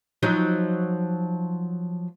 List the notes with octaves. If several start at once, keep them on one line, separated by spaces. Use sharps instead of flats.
F3 F#3 D#4